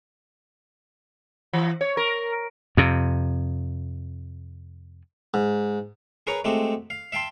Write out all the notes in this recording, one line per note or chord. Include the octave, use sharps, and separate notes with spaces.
E3
C#5
A#4
F2 C3
G#2
G#4 A#4 B4 C#5 A#5
G#3 A3 C4 F#4 G4
F5
E5 F5 G5 A5 C6